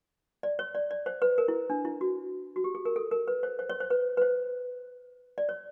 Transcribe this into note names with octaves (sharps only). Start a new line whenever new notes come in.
D5
C#5
D5
D5
C5
B4
A#4
E4
D4
E4
F#4
F#4
G4
G#4
A#4
A4
A#4
B4
C5
C5
C#5
C5
B4
B4
C5
D5
C#5